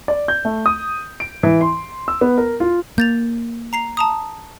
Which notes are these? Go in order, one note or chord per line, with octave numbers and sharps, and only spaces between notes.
D5
G6
A3
D#6
D7
E3
C6
E6
B3
A#4
F4
A#3 G6 A6 F7
A#5 C7 F7
A5 A#5 D#6